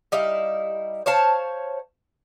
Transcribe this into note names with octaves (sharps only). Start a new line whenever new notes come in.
G3 D#4 E4 F5
C5 C#5 F5 A5